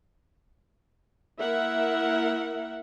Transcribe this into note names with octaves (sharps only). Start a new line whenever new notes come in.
A#3 E4 A#4 E5 F#5